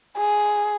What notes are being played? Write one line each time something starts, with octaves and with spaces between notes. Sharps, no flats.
G#4